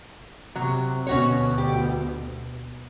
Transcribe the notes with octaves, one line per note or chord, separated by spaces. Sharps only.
C3 F#3
D2 B2 C#4 F#4 C#5
G4